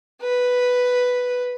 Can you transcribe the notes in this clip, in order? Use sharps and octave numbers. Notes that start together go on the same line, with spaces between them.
B4